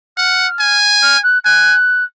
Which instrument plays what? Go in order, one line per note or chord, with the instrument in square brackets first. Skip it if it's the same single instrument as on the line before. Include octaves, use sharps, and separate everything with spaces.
[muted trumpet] F#5 [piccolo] F6
[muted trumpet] G#5
[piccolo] F6
F#6
[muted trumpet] G#5 [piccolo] F#6